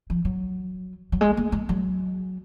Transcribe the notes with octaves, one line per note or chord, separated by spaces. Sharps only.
F3
F#3
F#3
G#3
A#3
G#3
F#3